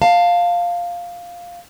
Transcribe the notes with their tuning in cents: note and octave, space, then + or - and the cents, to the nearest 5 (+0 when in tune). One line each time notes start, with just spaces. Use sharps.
F5 +0 A5 +25